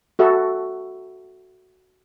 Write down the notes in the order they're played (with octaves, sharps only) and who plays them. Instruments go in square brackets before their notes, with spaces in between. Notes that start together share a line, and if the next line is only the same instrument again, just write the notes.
[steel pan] F#4 A4 E5